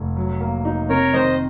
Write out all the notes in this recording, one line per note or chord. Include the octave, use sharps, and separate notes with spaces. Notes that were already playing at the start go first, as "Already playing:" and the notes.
Already playing: F1
F#3
A#3
D#4
C3 A#4 C#5
D#3 C5 D#5